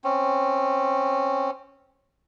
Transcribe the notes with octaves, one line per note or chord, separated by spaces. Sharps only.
C4 C#4